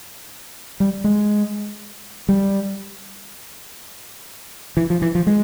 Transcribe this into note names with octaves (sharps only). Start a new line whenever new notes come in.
G3
G#3
G3
E3
F3
E3
F3
G#3